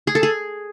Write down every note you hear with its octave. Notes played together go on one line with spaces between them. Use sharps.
G#4
A4
G#4